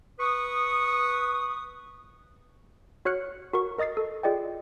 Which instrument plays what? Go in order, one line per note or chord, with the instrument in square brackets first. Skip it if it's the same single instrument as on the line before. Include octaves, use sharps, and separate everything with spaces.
[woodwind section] B4 C#6 D#6
[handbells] F#4 C#5 F6 F#6 C#7
F#4 A#4 C#6
A#4 D#5 D#6 A6 C7
A4
F4 G#4 D5 D#5 G5